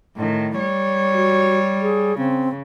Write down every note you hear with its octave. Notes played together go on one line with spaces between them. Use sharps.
A2 D#3
G3 C#5
F#4
G#4
C#3 C4